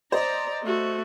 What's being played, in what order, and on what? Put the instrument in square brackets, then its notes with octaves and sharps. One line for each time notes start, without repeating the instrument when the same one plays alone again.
[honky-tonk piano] C5 D#5 [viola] D5 A#5
[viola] A3 F#4